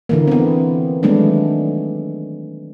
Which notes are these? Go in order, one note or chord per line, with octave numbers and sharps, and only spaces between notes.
D3 E3 A#3
B3 C4
D#3 F#3 G#3 A3 B3 D4